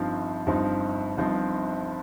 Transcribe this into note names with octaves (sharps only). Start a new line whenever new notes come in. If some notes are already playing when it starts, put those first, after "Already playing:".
Already playing: G1 G2 F3 C4 D#4
G1 G2 F3 C4 D#4
G1 G2 F3 C4 D#4